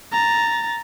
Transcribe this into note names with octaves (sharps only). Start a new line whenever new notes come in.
A#5 A6